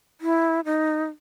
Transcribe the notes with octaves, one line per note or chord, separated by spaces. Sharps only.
E4
D#4